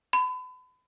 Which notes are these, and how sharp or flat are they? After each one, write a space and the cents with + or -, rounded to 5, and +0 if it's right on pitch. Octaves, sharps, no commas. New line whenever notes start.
B5 +35